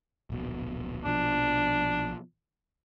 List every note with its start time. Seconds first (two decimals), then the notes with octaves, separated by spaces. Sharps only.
0.30 D1 A#1 B2
1.05 A#1 B2 F3 D4